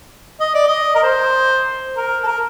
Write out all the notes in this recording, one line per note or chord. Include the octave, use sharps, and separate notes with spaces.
D#5
D5
D#5
A#4
C5
A#4
A4
A#4